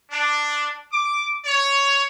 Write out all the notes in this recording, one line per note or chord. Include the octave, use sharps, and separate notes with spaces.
D4
D6
C#5